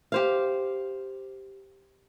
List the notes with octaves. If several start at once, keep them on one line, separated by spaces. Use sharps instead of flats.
G4 C5 F5